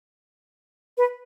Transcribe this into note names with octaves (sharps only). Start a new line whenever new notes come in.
B4